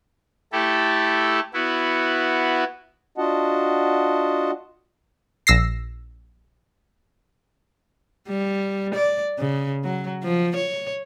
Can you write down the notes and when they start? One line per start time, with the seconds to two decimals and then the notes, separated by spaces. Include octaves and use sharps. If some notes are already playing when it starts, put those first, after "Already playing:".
0.52 A3 E4 G4 A4
1.54 B3 E4 F#4
3.18 D4 F4 F#4 D#5 F#5 A5
5.47 A#1 E6 A#6 C7
8.28 G3
8.95 D5
9.38 C#3
9.84 F#3
10.23 F3
10.56 C#5